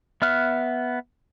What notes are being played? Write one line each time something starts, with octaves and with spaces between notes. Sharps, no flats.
B3 E5 F6 F#6